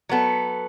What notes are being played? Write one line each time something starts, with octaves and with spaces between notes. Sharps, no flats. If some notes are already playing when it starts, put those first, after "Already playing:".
F#3 B3 A4